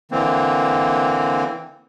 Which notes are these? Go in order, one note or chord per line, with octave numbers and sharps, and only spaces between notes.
D3 E3 A#3 C4